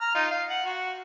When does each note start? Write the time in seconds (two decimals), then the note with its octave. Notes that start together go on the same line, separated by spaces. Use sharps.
0.01 A#5 F6
0.15 D#4 F4
0.31 F5
0.50 F#5
0.65 F#4